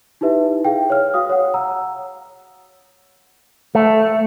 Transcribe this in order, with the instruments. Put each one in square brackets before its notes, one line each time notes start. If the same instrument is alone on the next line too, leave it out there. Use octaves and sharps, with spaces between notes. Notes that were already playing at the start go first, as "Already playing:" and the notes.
[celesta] D#4 E4 G4 B4 E5
G#4 F5 G5
C#5 F6
F#4 F5 D#6
C#5 F#5
F#5 A#5 E6
[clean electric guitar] A3